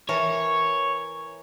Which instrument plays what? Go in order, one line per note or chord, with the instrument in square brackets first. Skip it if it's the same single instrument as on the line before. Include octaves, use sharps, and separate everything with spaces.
[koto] E3 A#4 A5 [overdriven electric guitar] C#5